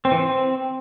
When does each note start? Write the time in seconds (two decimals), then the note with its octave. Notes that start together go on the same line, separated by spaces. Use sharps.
0.05 C4
0.12 E3
0.18 C4